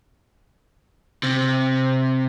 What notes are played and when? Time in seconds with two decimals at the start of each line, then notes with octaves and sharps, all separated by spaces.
1.23 C3